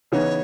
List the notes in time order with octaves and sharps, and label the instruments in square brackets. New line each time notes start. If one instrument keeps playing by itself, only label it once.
[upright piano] C#3 E3 B3 D#4 [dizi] C#5